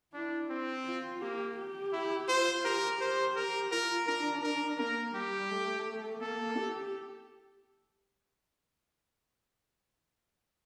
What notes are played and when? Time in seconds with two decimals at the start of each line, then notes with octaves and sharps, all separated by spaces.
0.14 D4 E4
0.50 C4
0.85 F4
1.22 A#3 G4
1.58 G4
1.93 E4
2.29 F4 C5
2.65 G4 A#4
3.00 G4 C5
3.36 A#4
3.72 F4 A#4
4.07 D4 A#4
4.43 A#4
4.79 A#3 A#4
5.15 G3 G4
5.51 A3
6.21 A#3 A4
6.57 G4